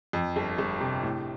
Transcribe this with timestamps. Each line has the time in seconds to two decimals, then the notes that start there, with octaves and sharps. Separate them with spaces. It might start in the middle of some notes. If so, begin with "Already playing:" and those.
0.13 F2
0.36 G1
0.58 G1
0.80 C3
1.03 A2